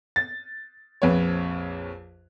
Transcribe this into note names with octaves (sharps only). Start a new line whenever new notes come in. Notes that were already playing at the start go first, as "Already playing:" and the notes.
A6
A#1 F2 B4 C#5